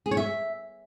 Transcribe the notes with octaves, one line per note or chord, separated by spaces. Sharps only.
G#4
C#5
E5